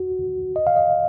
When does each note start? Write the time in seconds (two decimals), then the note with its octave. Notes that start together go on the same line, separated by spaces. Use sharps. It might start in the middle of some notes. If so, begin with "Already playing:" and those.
Already playing: F#4
0.56 D#5
0.67 F5
0.76 D#5